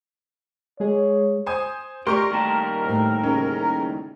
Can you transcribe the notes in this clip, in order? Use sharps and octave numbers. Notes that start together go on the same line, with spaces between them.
G#3 G#4 C#5
C5 G#5 D#6
A3 G4 A#4 D5 C6 C#6 D7
D#2 G3 A5
A2 C5
C#3 C#4